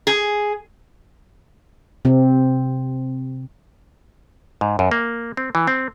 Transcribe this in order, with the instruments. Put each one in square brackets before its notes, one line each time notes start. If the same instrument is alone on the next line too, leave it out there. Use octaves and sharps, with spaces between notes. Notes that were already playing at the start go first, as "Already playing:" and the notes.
[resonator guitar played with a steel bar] G#4
[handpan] C3 C4
[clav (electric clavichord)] G#2
F#2
A#3
C4
E3
C4